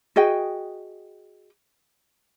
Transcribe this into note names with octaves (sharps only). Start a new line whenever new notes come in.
F#4 G#4 D#5 G5